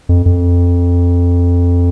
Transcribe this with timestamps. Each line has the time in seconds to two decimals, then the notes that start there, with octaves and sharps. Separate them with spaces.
0.09 F2
0.26 F2